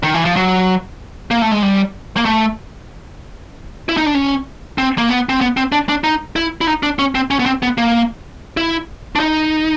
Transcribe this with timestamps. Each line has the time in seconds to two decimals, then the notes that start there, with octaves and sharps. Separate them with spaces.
0.03 D#3
0.14 E3
0.25 F3
0.36 F#3
1.31 A#3
1.42 A3
1.51 G#3
1.62 G3
2.17 A#3
2.25 A3
3.89 E4
3.97 D#4
4.06 D4
4.15 C#4
4.78 C4
4.98 A#3
5.09 B3
5.29 C4
5.41 B3
5.57 C4
5.72 D4
5.89 D4
6.04 D#4
6.36 E4
6.61 E4
6.67 D#4
6.83 D4
6.99 C#4
7.15 C4
7.30 C#4
7.39 B3
7.46 C4
7.63 B3
7.78 A#3
8.57 E4
9.16 D4
9.20 D#4